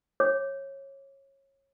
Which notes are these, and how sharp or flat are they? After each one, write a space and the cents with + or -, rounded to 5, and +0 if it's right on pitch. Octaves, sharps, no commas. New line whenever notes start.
C#5 -20 D6 +0